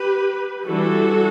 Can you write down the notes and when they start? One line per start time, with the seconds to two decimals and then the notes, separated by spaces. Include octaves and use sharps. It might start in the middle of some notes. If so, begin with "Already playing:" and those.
Already playing: G4 B4
0.66 E3 G3 D4 F#4 A4